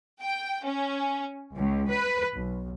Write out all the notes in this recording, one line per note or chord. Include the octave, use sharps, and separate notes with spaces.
G5
C#4
C#2
B4
B1